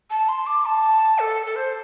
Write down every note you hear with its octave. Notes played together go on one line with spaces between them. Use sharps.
A5
C6
D6
A5
A4
A4
C5